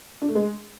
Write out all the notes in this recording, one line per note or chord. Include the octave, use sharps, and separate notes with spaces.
D4
A3
G#3